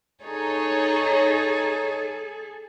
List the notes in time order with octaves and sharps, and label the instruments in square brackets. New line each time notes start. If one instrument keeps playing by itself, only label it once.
[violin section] D#4 C#5 [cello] G#4 A4